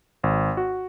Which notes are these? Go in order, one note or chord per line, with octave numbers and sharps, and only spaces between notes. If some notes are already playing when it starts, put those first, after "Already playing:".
G#1
F#4